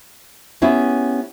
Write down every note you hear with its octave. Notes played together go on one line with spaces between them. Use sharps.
B3 C#4 E4 G4 G#4